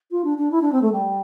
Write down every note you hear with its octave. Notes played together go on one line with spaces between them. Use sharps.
F4
D4
D4
E4
D4
C4
A3
G3